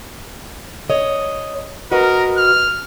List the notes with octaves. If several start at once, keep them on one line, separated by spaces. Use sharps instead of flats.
C#5 D#5
F#4 A#4 B4 D#5
F6